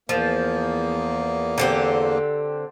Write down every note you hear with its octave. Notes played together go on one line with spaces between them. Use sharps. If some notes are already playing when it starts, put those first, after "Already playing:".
E2 F3 A#3
D3 C4 G4